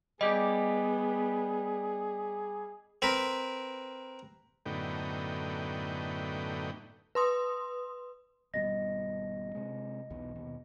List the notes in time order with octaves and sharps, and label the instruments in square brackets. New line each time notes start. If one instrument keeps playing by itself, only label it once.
[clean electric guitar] G3 G4 [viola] B3 [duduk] G#4 [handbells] D#5
[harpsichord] C4 A#4 B4
[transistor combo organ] F#2 A2 D3 B3 D#4 G5
[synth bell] B4 C6 D#6
[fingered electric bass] G#1 B2 G3 [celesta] D#5 A#6
[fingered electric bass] C3 G#3
B1 E2 B2
D#2 B2